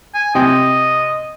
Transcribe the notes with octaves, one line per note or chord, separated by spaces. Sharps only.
G#5
C3 D#5 G5